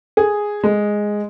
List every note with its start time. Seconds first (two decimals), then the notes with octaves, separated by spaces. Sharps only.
0.17 G#4
0.64 G#3